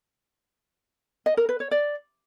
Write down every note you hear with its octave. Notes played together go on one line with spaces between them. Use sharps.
D#5
A#4
B4
C#5
D5